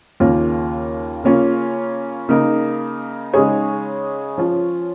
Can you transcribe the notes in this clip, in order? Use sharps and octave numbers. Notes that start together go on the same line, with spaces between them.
D#2 C#3 A#3 F4 C#5
C#3 A#3 C#4 F4
C#3 A#3 D#4 A#4
C#3 G#3 D#4 G#4 C#5
F3 C#4 F4 C#5